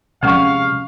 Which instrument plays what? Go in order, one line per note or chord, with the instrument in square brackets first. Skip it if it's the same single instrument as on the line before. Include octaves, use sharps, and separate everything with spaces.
[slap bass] C3 G#3 [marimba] F3 C#4 F#5 [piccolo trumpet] F5 [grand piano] C#6 F6